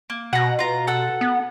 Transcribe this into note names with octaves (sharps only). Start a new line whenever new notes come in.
A#3
B2 F#5 A#5
F4 A#5
A4 F#5 E6
B3